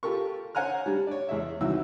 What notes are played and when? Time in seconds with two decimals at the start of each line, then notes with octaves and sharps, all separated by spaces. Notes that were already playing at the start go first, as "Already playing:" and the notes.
0.03 F4 G4 A4 A#4 C#6
0.55 C5 C#5 F#5 G#5 A#5 F6
0.86 G3 D4
1.07 C#5 D5
1.29 E2 G#3 C#5 E5
1.61 C2 D#3 E3 F#4 E6